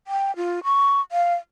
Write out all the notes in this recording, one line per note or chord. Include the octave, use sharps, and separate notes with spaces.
G5
F4
C#6
F5